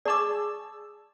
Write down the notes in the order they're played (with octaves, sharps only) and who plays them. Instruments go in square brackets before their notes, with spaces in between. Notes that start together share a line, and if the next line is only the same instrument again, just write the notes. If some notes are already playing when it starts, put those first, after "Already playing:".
[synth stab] G#4 A5 E6 [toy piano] D5 C#6 D6